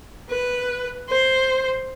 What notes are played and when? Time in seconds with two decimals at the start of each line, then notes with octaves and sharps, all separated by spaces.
0.29 B4
1.09 C5